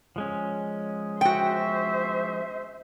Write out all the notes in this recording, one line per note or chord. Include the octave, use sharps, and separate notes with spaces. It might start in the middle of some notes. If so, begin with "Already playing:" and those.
F3 G#3 C#4
F#4 C5 E5 G5